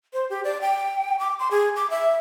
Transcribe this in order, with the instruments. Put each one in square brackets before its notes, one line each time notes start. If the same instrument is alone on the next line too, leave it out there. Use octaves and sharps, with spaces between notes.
[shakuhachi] C5
G4
D5
G5
D6
C6
G#4
D6
E5